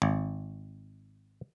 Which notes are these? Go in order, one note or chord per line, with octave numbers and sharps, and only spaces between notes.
G#1